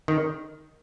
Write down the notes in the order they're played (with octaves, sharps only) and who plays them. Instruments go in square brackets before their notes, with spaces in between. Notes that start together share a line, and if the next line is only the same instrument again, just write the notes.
[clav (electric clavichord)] D#3